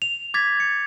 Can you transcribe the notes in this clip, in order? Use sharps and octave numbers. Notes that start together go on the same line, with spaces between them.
F7
D6 G#6 A6 B6
C#7